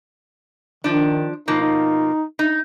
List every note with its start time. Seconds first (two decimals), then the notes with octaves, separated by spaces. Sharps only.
0.84 D#3 F3 D4
1.48 B2 F3 A#3 D#4
1.61 D#4
2.39 D#4